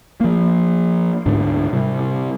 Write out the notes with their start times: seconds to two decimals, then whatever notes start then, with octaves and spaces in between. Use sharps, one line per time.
0.21 F3 A#3
1.26 D2 G#2 D3 D4
1.73 C3 G3